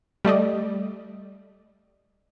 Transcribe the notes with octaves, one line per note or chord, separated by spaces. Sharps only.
G3 A3 D5 D#5